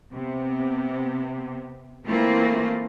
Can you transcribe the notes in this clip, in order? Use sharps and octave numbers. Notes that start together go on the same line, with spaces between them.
C3 B3
E3 A3 A#3 C4 F4